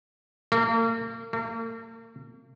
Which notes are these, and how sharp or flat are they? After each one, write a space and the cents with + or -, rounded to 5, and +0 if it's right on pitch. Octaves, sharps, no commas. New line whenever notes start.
A#3 -40
A#3 -45